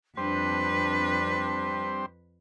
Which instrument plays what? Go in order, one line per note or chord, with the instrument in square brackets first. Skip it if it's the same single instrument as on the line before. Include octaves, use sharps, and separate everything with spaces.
[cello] F2 B4 [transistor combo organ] G3 C4 C5 [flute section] D4